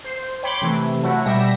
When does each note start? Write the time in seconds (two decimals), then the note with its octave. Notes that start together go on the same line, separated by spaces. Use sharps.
0.04 C5
0.43 C#5 G5 B5 C6 D6
0.62 C3 E3 A3
1.03 F#3 A3 E4 F#4
1.25 B2 G3 E5 G5 A#6 C#7